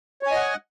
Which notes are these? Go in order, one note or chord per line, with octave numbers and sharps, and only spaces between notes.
C#5 D#5 F#5 G#5